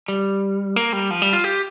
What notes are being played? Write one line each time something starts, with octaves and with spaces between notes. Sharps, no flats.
G3
A#3
G3
F3
G3
F4
G4